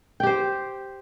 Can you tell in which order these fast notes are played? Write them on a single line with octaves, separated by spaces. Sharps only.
G5 G4 C5